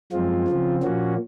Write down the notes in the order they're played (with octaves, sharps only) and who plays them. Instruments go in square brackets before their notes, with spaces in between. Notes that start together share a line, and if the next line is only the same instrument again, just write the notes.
[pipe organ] F#2 F3 G#3 C4 F4
C#3 F3 C4
A#2 F3 A#3 C#4 F#4